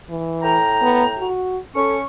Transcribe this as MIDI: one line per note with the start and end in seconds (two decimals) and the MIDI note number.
0.10 0.58 52
0.42 1.27 45
0.42 1.27 79
0.42 1.27 82
0.82 1.04 59
1.18 1.58 66
1.75 2.02 61
1.75 1.97 69
1.75 2.02 85